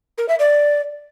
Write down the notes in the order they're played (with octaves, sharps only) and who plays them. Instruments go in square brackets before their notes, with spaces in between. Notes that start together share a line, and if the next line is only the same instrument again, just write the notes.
[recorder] A#4
E5
D5